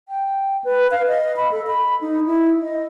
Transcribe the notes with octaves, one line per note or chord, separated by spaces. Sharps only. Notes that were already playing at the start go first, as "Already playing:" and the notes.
G5
B4
F5
D#5
B5
A4
B5
D#4
E4
D#5